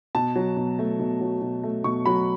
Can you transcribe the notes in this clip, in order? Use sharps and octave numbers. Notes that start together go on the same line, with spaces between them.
B2 A5
F#3
B2
A3
B2
F#3
B2
A3
B2 C#6
F#3 B5